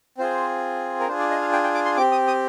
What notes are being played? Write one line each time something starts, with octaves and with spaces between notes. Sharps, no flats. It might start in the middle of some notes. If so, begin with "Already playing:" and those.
C4 F4 G#4 C5
A#4
D4 F4 G#4 C5
D5
D#5
F5
G5
G5
D6
C6
C4 G4 D6
D#6
D#6